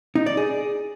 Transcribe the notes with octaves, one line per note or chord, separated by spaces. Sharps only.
D#4
D5
G#4